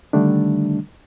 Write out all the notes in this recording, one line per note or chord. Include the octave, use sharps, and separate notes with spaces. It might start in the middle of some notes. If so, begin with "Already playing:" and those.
D3 D#3 G3 A3 D4